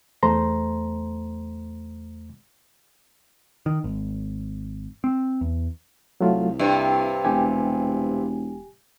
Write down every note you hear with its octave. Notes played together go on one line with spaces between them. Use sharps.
E2 A3 C5 A#5 C6
D#3
G#1
C4
E2
C2 F#3 A3 F4
G2 C3 E5
E1 G4 G#5